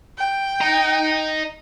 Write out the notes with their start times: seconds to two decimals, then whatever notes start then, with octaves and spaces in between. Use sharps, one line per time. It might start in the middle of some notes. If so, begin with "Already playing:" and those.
0.18 G5
0.61 D#5 A#5